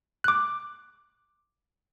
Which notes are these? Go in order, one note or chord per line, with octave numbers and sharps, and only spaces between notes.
D6 F#6